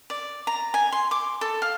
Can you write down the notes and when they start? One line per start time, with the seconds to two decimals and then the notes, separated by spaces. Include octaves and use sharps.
0.10 D5
0.47 A#5
0.74 G#5
0.92 C6
1.11 D6
1.41 A4
1.62 F5